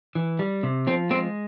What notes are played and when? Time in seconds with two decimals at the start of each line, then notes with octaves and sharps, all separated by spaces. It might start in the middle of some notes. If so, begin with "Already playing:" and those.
0.15 E3
0.39 G3
0.63 C3
0.87 F3 C4
1.10 G#3 C4